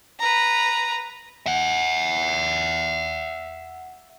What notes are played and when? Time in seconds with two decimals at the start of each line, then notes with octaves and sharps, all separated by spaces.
0.20 B4 A#5
1.46 E5 F#5